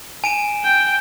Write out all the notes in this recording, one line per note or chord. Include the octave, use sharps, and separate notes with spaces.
G#5 D7 E7
G5